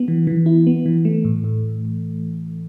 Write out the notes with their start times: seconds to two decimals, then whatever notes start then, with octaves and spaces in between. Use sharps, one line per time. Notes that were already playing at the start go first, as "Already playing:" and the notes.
Already playing: B3
0.08 E3
0.27 E3
0.46 E4
0.67 B3
0.86 E3
1.05 A3
1.25 A2
1.44 A2